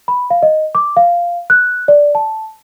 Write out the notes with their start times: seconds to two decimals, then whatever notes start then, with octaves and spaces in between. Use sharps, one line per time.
0.08 B5
0.30 F5
0.43 D#5
0.75 D6
0.96 F5
1.50 F#6
1.88 D5
2.15 A5